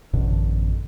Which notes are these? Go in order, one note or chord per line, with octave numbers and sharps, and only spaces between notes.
A1 F#2 B2 D3